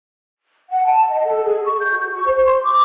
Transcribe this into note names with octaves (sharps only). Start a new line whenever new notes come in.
F#5
A5
D#5
A4
G#4
C#6
G6
F#4
C#6
C5
C6
D6